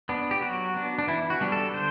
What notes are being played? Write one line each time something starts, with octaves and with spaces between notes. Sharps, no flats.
B3 D4
G4
F#3 F#4
B3 D4
D4
E3 E4
F#4
G3 B3 D4
A4
D3 C5